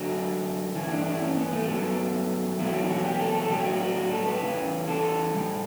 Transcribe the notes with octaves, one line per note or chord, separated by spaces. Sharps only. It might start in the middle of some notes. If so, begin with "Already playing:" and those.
Already playing: F#2 D3 A3 F#4
G2 E3 A3 E4
D4
E4
C#4
B3
A3
G2 F#3 A3 B3
E2 B2 F#3 A3 E4
F#4
E4
F#4
G4
A4
A4
A2 F#3 A3 G4
F#4
F#4
F#4
A4
B4
E2 C#3 E3
A4
A2 G3